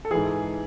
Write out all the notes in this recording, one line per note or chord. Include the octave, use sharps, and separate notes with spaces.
A4
G#2 E3 G#4